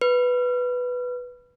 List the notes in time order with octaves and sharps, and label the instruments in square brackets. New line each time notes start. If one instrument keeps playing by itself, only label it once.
[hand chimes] B4